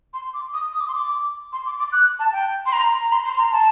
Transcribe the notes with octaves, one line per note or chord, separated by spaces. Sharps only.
C6
D6
D#6
D#6
D6
C6
D6
C6
D6
D6
F#6
A5
G5
C6
A#5
A#5
C6
C6
A#5
A5